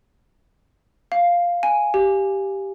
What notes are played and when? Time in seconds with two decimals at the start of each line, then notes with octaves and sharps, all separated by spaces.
1.12 F5
1.63 G#5
1.94 G4